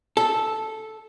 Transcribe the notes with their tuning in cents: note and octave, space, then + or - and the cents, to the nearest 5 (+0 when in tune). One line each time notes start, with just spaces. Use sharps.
A4 -5